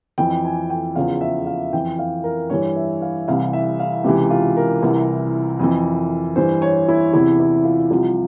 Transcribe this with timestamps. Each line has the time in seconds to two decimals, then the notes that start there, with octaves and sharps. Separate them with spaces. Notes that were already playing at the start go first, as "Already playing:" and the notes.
0.18 F2 E3 G5
0.45 G#5
0.70 G5
0.95 E2 C#3 F3 F5
1.21 E5
1.47 F5
1.73 F2 E3 G5
1.99 F5
2.24 A#4
2.50 G2 E3 C#5
2.76 E5
3.02 F5
3.28 C2 C3 E3 F5
3.53 E5
3.79 F5
4.04 C#2 C3 E3 G4
4.30 F4
4.57 A#4
4.82 C2 C3 E3
5.59 F2 E3
6.36 G2 E3 C5
6.62 C#5
6.88 E4
7.13 E2 C3 E3 E4
7.40 E4
7.65 F4
7.91 C2 C3 F3